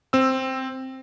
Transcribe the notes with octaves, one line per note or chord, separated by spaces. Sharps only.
C4 E6